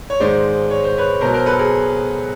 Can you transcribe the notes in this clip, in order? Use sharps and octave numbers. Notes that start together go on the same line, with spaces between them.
C#5
G#2 D#3 G#3 C5 D5
C#5
C5
B4 C#5
B2 F#3 A#4 C5
A#4 C5
A4 B4
G#4 A#4